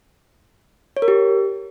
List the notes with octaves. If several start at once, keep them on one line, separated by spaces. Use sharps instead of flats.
C#5
A#4
G4